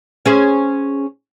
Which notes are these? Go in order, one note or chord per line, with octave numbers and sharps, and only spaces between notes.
C#4 G#4 C5